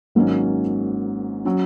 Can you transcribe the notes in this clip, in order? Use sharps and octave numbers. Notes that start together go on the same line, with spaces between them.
G#1 G#2 F#3 A#3 C#4
F#3 C#4